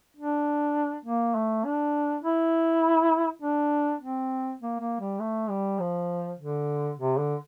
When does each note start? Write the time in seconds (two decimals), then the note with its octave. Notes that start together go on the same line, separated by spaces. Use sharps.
0.16 D4
1.05 A#3
1.35 A3
1.65 D4
2.24 E4
3.42 D4
4.01 C4
4.61 A#3
4.80 A#3
5.00 G3
5.20 A3
5.50 G3
5.80 F3
6.38 D3
6.98 C3
7.18 D3